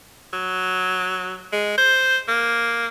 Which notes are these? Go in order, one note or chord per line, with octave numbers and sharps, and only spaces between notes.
F#3
G#3
C5
A#3